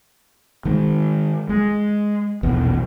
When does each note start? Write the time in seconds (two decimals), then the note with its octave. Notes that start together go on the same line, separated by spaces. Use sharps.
0.65 D#3 G#3
1.49 G#3
2.43 A#1 E2 B2